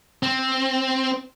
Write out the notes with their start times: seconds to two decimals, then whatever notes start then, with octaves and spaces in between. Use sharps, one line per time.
0.23 C4